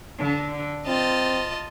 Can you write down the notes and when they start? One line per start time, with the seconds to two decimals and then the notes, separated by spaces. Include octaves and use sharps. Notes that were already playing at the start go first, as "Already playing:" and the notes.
0.17 D3
0.86 C4 F4 D#5 A5